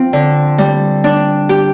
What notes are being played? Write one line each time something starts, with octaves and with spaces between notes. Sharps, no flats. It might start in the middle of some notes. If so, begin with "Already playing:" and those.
Already playing: F3 C4
D3
G3
D4
G4